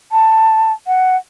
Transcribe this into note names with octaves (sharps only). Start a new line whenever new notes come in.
A5
F#5